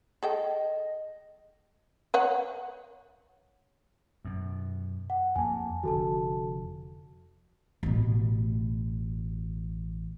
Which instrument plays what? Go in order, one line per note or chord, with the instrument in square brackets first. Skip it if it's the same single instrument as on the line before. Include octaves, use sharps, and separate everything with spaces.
[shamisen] G#4 A4 G5 [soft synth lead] D#5
[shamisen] B4 C#5 F#5
[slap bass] F#2 B2
[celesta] F#5
[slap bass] F2 A#3 [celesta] G#5 A5
[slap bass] F1 D3 F3 [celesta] F#4 A4 A5
[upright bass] A1 B2